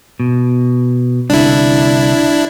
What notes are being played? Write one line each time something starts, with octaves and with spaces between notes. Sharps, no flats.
B2
C2 D3 D4 E4